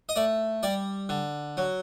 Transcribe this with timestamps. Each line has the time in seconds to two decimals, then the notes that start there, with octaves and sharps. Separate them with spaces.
0.09 D#5
0.16 A3 D5
0.63 G3 D5
1.09 D3
1.57 F#3